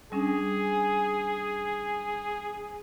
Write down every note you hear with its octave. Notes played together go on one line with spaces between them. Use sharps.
G3 C#4 D4 G#4